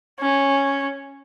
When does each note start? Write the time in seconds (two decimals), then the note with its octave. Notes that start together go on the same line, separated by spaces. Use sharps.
0.20 C#4